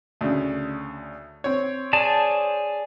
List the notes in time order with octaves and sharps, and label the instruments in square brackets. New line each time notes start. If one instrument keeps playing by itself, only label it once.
[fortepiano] D2 C#3
C4 C#5
[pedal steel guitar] G#4 D5 A5